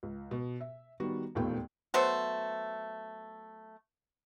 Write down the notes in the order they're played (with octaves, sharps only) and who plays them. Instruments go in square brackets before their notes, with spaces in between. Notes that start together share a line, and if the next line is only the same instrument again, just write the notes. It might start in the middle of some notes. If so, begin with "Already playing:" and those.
[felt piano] C#2
B2
E5
D#3 G3 B3 F#4
E1 D#2 A#2 A3 B3 G5
[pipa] F#3 A3 B3 C5